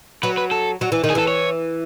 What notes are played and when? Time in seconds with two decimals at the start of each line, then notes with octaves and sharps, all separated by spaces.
0.23 F#3 B4
0.37 B4
0.51 A4
0.81 F#3
0.92 E3
1.04 D#3
1.10 G#4
1.15 E3 A4
1.28 C#5